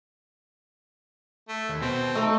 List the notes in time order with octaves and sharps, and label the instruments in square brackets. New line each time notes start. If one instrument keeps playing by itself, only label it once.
[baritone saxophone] A3
[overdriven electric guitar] D#2
[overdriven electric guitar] B2 [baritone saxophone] C4
[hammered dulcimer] A3 [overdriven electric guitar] D#5 A#5